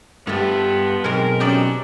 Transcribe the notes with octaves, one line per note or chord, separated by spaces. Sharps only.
G2 F3 A3 B3 G4 A4
B1 G#3 C4 A#4
D#3 F3 F#3 C#4 D#4 G4 D5